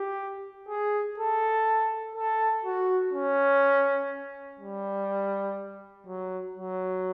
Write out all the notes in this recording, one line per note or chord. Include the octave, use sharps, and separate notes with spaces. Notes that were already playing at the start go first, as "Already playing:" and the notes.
Already playing: G4
G#4
A4
A4
F#4
C#4
G3
F#3
F#3